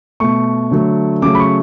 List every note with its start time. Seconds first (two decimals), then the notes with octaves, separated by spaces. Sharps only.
0.20 B2 A3 C#6
0.71 D3 F#3 A3
1.22 C#3 F#3 A3 D6
1.35 B5
1.40 C#6